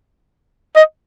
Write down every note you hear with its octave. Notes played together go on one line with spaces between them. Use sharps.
D#5